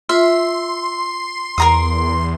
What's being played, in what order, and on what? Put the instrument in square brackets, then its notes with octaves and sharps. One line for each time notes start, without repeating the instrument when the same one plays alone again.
[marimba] F4 [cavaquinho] E5 [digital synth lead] C6
[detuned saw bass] E2 [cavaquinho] A#4 A#5 D#6